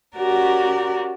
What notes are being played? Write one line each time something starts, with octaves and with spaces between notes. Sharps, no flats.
C#4 F#4 G4 A#4 D5